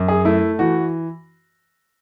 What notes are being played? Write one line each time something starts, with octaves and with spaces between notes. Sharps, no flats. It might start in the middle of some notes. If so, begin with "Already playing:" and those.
Already playing: F#2
G#4
A3 E4
E3 F#4